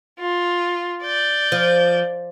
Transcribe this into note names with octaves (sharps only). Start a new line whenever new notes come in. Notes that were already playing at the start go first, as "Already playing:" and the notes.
F4
D5 G6
F3